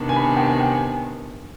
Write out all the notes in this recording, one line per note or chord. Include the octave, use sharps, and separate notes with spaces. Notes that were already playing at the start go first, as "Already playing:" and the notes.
Already playing: C3 D#3 B3 D4
G#5
B5
G5
G#5
G5
G#5